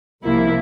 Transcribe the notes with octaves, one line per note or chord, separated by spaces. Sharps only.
C2 C3 F3 A#3 E4